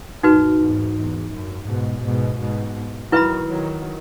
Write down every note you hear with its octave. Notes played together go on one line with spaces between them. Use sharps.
F#2 A#2 D#4 F#4 B4
E2 G#2
E2
F#2
G#2 B2
G#2 B2
G#2 B2
D#3 F#3 E4 B4 E5 B5
D#3 F#3